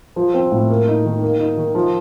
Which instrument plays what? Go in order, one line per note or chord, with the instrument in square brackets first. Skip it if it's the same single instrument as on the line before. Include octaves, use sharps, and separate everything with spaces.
[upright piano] F3
C4
A2
A#3
D#4
D#3
A#3
D#4
D#3
F3